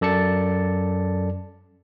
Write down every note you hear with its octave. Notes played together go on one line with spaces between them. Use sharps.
F#2 A4 D5 A5 C#7